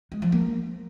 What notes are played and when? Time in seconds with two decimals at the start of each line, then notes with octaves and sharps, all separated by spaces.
0.12 G#3
0.22 F3
0.32 A#3